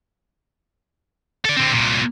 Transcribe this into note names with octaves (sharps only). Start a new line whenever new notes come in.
A4 D5
D3 C4
C2 A#2